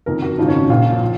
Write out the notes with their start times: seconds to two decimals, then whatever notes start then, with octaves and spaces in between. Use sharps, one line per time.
0.06 F#1 F2 D#3 A#4
0.22 F#4
0.38 G#1 F#2 C#3 F3 D#4
0.48 C#4
0.70 A#1 A#2 F3 F4
1.02 F3